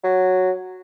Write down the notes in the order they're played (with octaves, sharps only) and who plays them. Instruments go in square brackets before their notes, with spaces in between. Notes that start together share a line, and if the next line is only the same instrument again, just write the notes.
[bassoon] F#3